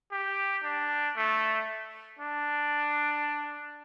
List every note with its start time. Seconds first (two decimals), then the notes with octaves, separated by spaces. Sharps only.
0.12 G4
0.64 D4
1.17 A3
2.19 D4